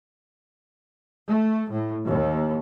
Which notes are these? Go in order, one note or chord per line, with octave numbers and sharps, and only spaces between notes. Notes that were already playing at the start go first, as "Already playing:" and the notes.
A3
A2
D#2